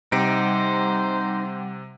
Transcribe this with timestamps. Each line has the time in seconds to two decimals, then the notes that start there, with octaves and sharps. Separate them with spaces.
0.12 C3 G3 D#4 C5 F#5 D6 D7